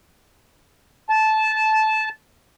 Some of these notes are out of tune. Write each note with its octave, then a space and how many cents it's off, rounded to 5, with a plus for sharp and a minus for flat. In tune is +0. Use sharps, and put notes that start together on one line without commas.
A5 -15